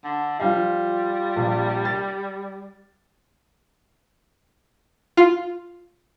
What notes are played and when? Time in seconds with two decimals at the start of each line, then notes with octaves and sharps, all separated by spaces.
0.04 D3
0.40 F3 G3 F4 F5
1.36 A#1
1.85 A6
5.17 F4